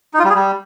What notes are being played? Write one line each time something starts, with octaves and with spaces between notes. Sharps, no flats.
D#4
F4
G3
G#4
G3